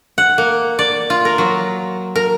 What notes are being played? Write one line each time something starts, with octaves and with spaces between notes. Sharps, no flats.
F#5
A#3
D5
F4
A#4
F#3
A#4